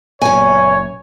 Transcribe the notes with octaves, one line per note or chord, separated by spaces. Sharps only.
F#1 E2 A#2 C#5 G#5